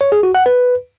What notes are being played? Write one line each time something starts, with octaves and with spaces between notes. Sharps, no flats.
C#5
G#4
F#4
F#5
B4